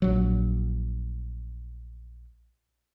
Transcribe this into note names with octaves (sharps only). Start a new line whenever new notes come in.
A#1 F#3